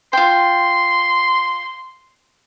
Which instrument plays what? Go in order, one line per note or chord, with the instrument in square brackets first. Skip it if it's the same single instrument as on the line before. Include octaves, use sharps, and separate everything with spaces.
[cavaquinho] F4 G5 [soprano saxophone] C6